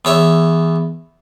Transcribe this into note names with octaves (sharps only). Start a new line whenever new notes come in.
E2 C#5 E5